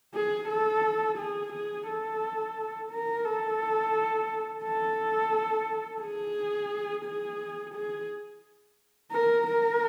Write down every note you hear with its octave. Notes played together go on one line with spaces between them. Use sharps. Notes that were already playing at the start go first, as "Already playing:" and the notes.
G#4
A4
G#4
G#4
A4
A#4
A4
A4
G#4
G#4
G#4
A#4
A#4